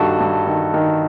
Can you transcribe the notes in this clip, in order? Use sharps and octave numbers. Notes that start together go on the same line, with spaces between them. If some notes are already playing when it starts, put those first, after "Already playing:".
Already playing: G2 D#3 F#4 A4
G2
D#3
D#3